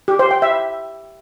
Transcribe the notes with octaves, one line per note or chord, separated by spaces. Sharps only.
G4
C5
G5
E5